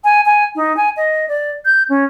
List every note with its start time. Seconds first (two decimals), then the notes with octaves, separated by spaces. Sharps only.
0.04 G#5
0.26 G#5
0.56 D#4
0.77 G#5
0.97 D#5
1.28 D5
1.65 G6
1.89 C#4